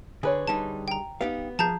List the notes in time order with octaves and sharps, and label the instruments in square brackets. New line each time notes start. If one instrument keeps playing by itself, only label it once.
[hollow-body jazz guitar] D3 [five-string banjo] G#4 B4 C#5
[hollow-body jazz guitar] D3 G3 D#4 [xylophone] A5
[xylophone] G5 A#5
[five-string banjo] B3 [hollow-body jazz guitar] D#4 G4 F5
[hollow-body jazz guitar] F3 G#4 [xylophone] A5 A#5 G6